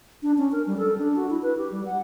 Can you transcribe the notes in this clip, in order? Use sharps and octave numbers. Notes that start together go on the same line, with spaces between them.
D4
C#4
A#4
G3
A4
D4
F#4
E4
B4
G4
G3
F#5